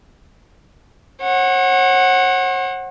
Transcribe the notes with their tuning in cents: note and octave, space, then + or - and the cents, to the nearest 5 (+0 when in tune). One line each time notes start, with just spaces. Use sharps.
C#5 -45 F#5 +0